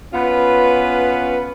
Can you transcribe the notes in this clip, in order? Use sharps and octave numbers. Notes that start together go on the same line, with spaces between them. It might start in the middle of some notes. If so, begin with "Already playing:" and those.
B3 C#4 F4 B4